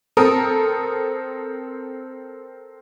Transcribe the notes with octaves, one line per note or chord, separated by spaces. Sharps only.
C4 A4 A#4 D#6